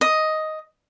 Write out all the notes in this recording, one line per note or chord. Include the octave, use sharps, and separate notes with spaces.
D#5